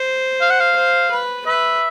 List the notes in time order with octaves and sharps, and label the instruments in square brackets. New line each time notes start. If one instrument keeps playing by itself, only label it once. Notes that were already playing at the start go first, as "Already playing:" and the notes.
Already playing: [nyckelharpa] C5
[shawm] F5
F#5
F5
[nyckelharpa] C5
B4
[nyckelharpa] B4 [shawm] E5